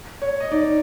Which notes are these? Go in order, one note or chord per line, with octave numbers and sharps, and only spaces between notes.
C#5
D#5
D#4 D5